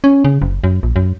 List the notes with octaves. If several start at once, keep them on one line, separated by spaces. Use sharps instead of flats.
C#4
C#3
F#1
F#2
A#1
F#2